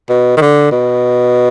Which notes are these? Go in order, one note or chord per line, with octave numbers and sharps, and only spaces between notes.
B2
D#3
D3
B2